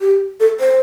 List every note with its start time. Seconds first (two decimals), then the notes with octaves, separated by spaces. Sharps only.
0.01 G4
0.40 A4
0.60 C5